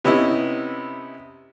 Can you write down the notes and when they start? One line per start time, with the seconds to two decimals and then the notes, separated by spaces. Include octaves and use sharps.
0.05 C3 B3 C#4 D#4 E4